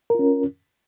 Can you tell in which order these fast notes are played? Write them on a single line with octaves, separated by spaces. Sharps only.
A#4 F4 C#4